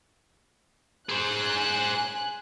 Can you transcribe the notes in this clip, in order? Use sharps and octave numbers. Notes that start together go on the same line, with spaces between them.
G#4 C5 G#5 F#6